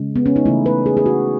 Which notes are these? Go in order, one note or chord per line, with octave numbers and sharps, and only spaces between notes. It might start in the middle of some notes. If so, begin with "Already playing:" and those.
Already playing: C#3 G#3
B3
C#4
D#4
C#3 E3 A3 E4
B4
G#4
G#4
F#4